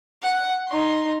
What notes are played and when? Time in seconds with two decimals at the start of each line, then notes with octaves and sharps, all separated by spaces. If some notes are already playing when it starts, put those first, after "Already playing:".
0.22 F#5
0.68 D#4 C6